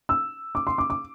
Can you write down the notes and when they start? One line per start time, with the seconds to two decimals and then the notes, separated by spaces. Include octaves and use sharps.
0.09 E6
0.55 D6
0.67 C6
0.78 D6
0.90 D6